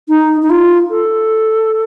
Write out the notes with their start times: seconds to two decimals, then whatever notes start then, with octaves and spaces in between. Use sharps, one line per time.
0.09 D#4
0.43 D#4
0.50 F4
0.90 A4